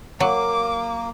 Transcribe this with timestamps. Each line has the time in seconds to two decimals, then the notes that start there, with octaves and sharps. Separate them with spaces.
0.20 F#3 A#3 D6